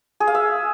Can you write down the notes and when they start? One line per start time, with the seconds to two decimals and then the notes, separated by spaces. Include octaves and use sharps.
0.20 G#4
0.27 F5
0.35 E5